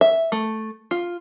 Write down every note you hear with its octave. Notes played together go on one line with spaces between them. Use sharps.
E5
A3
F4